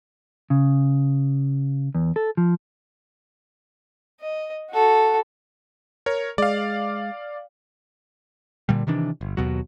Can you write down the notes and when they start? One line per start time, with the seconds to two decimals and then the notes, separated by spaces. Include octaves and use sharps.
0.50 C#3
1.95 E2
2.16 A4
2.37 F3
4.21 D#5
4.70 F#4 A4
6.06 A#4 C#5
6.38 G#3 D5 F5
8.69 A#2 D3 G3
8.87 C3 D#3 E3 D4
9.21 G1
9.37 D#2 B2 F#3